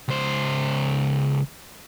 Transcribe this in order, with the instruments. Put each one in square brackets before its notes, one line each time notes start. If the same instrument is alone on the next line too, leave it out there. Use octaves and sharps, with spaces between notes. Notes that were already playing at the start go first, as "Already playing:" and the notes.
[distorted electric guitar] C#2 C5